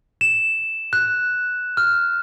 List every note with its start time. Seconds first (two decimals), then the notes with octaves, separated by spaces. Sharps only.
0.21 E7
0.93 F#6
1.77 F6